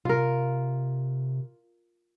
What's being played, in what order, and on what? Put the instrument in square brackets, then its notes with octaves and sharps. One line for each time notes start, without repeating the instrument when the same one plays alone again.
[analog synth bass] C3 [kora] F4 A#4